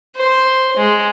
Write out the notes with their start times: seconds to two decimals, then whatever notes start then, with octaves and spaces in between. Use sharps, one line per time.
0.16 C5
0.77 G#3